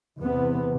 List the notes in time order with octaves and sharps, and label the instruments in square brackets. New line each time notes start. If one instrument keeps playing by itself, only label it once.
[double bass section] E2 C3 B3